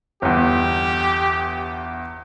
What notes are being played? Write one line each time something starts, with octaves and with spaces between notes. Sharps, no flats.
G1 E2 G4